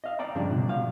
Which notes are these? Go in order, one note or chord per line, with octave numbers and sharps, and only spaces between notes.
D#5 F5
D5 G5 A#5
G2 C#3 F3 D4
B2
F#3 F5